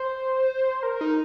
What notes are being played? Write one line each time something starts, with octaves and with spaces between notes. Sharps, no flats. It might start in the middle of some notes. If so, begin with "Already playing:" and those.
Already playing: C5
A#4
D#4